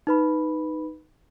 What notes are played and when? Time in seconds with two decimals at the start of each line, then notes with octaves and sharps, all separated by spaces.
0.07 D#4 B4 B5